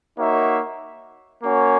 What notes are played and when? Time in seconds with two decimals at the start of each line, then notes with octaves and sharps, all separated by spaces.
0.18 A#3 D#4 F#4 C#5 E5
1.44 A#3 C#4 F#4 C#5